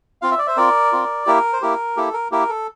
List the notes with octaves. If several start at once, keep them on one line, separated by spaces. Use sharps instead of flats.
C4 F4 F5
E5
D5
C5 E5
C4 F4 A#4 D5
C4 F4
A#3 E4 G4 A#4
C5
A#3 E4 G4 A#4
A#3 E4 G4 A4
A#4
A#3 E4 G4 A#4
A4